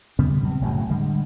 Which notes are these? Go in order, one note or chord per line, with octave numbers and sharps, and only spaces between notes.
C#3 F#3 G3 B3
B2 F#3 G3 C4
F#1 A2 C#3 F#3
D3 G3 G#3